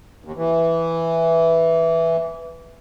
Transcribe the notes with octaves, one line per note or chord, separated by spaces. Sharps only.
D#2
E3